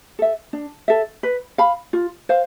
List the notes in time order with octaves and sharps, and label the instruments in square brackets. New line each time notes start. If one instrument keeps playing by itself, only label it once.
[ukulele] A4 E5
D4
A4 E5
B4
F5 B5
F4
C5 F5